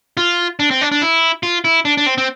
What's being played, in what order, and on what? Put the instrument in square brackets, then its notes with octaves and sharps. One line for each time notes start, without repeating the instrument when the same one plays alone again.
[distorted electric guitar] F4
D4
C4
D4
D4
E4
F4
E4
D4
D4
C4
C4